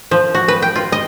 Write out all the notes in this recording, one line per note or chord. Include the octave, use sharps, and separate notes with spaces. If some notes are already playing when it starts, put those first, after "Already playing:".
F3
F#4
B4
G5
F4
D#5